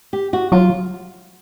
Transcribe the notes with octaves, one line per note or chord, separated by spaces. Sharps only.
G4
F#4
F#3 F4